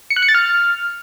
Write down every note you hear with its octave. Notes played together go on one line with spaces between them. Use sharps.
C#7
F#6
C#7
A6
F6